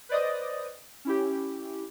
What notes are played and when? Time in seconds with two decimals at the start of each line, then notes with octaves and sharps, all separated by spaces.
0.09 B4 C5 D5 D#5 D#6
1.05 C#4 E4 G4